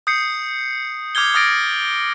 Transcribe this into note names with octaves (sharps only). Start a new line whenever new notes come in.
D#6 G6 C7 C#7
D6 F6 G6 G#6 G7
D6 D#6 F6 A6 A#6 D7